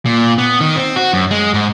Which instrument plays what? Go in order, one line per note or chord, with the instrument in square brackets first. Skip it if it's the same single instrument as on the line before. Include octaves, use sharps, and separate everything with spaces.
[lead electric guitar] A#2
B3
D#3
C4
F#4
F#2
G#3
G#2